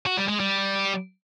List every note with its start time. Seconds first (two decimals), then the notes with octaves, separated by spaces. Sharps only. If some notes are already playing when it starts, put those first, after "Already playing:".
0.06 F#4
0.17 G3
0.29 G#3
0.40 G3